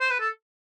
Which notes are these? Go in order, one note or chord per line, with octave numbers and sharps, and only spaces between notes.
C5
B4
A4